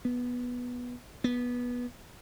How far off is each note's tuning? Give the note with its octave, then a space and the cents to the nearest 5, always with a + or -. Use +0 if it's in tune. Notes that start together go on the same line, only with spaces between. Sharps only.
B3 -10
B3 -15